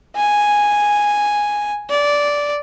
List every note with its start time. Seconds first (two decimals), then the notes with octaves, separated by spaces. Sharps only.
0.16 G#5
1.90 D5